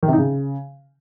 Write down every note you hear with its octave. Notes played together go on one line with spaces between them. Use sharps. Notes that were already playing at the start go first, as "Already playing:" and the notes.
D#3
C3
D#4
C#3